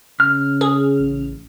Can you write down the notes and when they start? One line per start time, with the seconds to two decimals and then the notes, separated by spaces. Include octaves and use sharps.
0.20 C#3 F6
0.61 G#4
0.99 A1